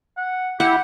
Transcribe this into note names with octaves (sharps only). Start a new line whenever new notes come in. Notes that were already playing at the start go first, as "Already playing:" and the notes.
F#5
E4 G4 F#5